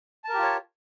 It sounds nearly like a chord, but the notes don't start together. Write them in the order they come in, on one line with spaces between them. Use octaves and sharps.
A5 A#4 G4 F4 C#5